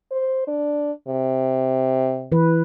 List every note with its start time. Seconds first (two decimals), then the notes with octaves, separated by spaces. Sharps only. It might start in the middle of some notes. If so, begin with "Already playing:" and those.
0.12 C5
0.48 D4
1.08 C3
2.32 E3 B4